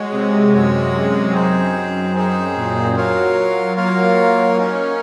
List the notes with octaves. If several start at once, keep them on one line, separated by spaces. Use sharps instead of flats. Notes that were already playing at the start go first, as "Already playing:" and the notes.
Already playing: G#3 F#4 C#5 F#5
C3
F#2 F#4 C#5 F#5
C4 D#4 G#4 C5
F#2 C4 D#4 G#4 C5
A#2
F#3 F4 A#4 C#5 F5
A#3 F4 A#4 C#5 F5
C#4 D#4 A#4 C#5